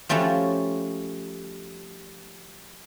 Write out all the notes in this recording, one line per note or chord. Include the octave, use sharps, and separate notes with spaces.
F3 G3 A3 C#4 F#4